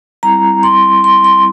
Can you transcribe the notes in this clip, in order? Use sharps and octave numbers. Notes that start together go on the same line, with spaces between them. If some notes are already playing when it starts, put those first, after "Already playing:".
G3 C4 E4 A#5
C6
C6
C6